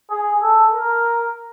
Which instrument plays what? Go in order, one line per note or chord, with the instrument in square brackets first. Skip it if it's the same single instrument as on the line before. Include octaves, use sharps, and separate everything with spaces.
[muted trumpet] G#4
A4
A#4